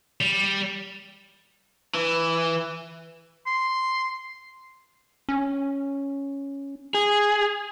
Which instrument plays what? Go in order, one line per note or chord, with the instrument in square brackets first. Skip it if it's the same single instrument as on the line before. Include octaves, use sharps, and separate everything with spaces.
[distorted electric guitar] G3
[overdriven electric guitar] E3
[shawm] C6
[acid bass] C#4
[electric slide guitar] G#4